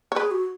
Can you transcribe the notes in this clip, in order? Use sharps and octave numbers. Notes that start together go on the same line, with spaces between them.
C#5
G#4 B4
F#4